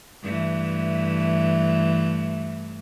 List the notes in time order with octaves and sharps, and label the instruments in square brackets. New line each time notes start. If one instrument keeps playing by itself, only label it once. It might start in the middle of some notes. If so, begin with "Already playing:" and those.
[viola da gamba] G2 E3 A3